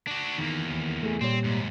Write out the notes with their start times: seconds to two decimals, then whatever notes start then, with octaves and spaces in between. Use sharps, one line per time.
0.07 D4 F#4
0.38 E2 D#3 A#3
0.69 D#2
1.03 A3 G#4
1.21 A#2 G3 C4 C#5
1.44 D#2 G#2